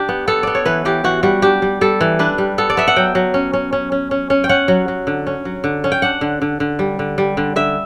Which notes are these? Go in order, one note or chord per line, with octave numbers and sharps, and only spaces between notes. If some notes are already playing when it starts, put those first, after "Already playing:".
Already playing: D4 G4
B3
B3 A4
B3 D5
C#5
E3 B4
E3 G4
E3 F#4
G3 F#4
D4 G4
G3
G3 A4
E3
D4 B4
G3
B3 A4
D5
B3 E5
F#5
F#3 G5
F#3
C#4
C#4
C#4
C#4
C#4
C#4
G5
C#4 F#5
F#3
F#3
D3
C#4
F#3
D3
C#4
G5
D4 F#5
D3
D3
D3
G3
D3
G3
D3
D3 E5